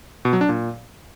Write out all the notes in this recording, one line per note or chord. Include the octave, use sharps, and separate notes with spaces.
B2
F#3
D4
A#2